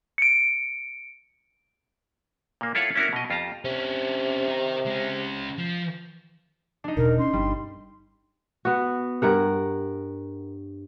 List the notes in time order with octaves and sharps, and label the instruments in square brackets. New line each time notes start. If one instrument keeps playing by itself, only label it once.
[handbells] C#7 D7
[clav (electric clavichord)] A#2 A#3
E4 F4 A4 C#5 F5 F#5
C#4 D4 E4 F#4 A#4
B2 D#5
F2 F4 G4 A5 A#5
[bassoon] C3 [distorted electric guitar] C#4 D4
[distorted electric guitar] D#4 A#4
G#3 C#4
F3
[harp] D4 D#4
[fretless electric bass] E1 B2 [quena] A#4
[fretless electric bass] C#4 [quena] C6
[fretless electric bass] G1 [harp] G3
[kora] B3 F#4
G2 A#4 F#5